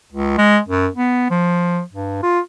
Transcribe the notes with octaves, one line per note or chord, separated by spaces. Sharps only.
C#2
G#3
F#2
B3
F3
G2
F4